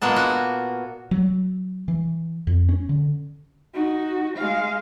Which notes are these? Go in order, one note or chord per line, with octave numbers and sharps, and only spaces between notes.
A#2 G#3 A#3 B3 A5
F#4
F#3
E3
F2
C#4
D3
D#4 F#4
G#3 F5